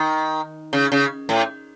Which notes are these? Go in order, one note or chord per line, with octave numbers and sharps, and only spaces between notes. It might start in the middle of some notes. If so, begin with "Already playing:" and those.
Already playing: D#3
C#3
C#3
A2